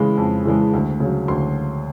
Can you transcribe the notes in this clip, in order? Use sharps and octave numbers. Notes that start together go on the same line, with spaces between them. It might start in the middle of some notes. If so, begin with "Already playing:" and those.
Already playing: C#3 E3 G#3 B5
F2
C#3 E3 G#3
D2
C#3
F#3
D2 C6